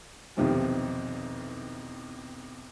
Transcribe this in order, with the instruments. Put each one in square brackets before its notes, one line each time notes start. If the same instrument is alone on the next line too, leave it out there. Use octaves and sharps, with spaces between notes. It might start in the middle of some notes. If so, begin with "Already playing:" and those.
[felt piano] B1 E2 C3 D#3 F3 G3